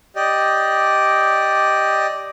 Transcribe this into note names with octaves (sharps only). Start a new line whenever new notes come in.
G4 D5 D#5